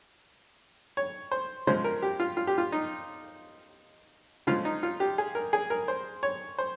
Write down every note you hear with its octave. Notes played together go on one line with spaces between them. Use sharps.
C#5
C5
C#3 F3 G#3 C5
A#4
G4
F4
F4
G4
F4
D#4
C#3 F3 G#3 F4
D#4
F4
G4
G#4
A#4
G#4
A#4
C5
C#5
C5